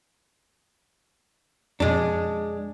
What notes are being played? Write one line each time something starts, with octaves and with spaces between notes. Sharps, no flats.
F2 B2 G#3 D4